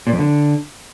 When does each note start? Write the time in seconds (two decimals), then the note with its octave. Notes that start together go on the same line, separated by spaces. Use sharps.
0.07 A#2
0.13 F2
0.19 D3